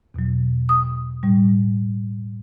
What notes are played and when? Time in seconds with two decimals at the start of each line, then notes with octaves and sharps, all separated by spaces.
0.14 E2 B2 F#3
0.69 D#6
1.23 A2 G3